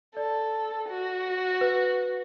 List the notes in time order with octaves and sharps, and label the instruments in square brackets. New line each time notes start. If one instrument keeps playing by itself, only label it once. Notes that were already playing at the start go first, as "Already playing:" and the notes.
[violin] A4 [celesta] D5
[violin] F#4
[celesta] B4